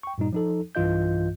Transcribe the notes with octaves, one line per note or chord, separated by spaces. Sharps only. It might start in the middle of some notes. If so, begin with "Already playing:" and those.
G5 C#6
G2 A#2 G3 D#4
F3 D#4 A4
B1 G2 E3 F4 D#5 G6